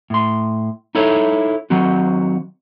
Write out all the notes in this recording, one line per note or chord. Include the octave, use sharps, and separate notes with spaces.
A2 C6
D#4 E4 A4 C#5
D#3 F#3 C4 F#4